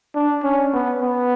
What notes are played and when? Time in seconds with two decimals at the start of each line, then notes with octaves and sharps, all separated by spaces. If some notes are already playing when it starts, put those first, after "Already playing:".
0.15 D4
0.43 C#4
0.73 B3
1.01 B3